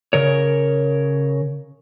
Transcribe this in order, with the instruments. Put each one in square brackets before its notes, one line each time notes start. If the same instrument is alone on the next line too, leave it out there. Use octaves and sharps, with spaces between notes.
[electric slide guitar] C#3 A#4 C#5